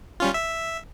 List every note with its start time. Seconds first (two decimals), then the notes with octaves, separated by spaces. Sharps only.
0.20 G3 C#4 F4
0.34 E5